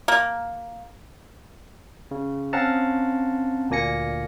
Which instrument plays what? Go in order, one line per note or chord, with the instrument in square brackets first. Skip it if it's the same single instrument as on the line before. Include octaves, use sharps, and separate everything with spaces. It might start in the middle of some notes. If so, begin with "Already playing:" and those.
[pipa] A#3
[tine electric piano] C#3
C4 C#4 F5 F#5 A5 A#5
D2 A#2 A#3 G#5 A#6 C#7